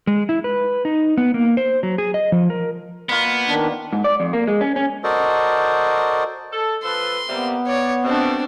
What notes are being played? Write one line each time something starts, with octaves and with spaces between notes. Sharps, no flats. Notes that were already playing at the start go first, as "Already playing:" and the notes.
G#3
E4
B4
D#4
B3
A#3
C5
F#3
G#4
D#5
F3
A#4
B2 A#3 B3 F4
D#3 D4
G#2
D5
F2
A#3
G#3
C#4
C#4
F#4 A4 A#4 C5 D5 D#5
A4
F3 A4 B4 C6
C3 G3 A#3 B3
C#5 D5
B2 A3 C4 D4